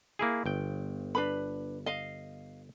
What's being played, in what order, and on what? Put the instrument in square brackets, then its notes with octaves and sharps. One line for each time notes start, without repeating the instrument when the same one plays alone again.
[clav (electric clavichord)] A#3 E4 G#4
G1 G5
[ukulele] D4 B4 B5
D#5 F5